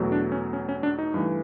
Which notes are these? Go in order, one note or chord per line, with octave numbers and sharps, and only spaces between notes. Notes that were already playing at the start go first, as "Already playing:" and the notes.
Already playing: E2 B2 F#3 A3
D4
C#4
C#4
C#4
D4
D#4
G2 E3 A3